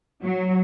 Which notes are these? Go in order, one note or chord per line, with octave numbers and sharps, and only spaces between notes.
F#3